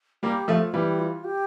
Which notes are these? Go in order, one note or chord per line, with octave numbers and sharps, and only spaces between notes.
G3 A#3 G4
F3 A3 F4
E3 G3 G4
F4
G4